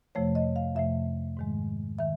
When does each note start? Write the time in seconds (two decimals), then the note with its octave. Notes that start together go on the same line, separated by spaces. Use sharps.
0.15 F2 C3 F3 A3 C#5
0.35 D#5
0.56 F5
0.76 F2 C3 F3 A3 E5
1.37 G#2 D#3 G#3
1.99 D#3 E5